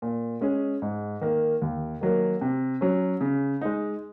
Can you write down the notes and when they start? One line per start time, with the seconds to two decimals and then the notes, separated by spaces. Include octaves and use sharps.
0.02 A#2
0.41 G#3 C#4 G#4
0.82 G#2
1.21 D#3 A#3
1.62 D#2
2.01 D#3 F#3 A#3
2.41 C3
2.81 F#3 C#4
3.21 C#3
3.61 G#3 D#4